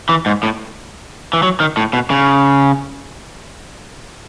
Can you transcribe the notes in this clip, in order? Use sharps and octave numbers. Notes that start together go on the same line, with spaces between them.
E3
G#2
A2
E3
F#3
D#3
A2
B2
C#3